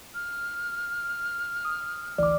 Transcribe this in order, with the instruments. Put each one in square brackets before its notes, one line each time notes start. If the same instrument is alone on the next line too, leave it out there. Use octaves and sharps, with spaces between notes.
[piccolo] F6
[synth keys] D#6
[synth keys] A1 D2 E3 [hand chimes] D5 D6